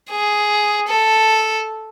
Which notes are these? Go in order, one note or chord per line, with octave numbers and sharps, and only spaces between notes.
G#4
A4